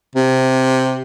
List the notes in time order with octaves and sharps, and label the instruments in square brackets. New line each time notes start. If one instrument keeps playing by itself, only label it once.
[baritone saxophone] C3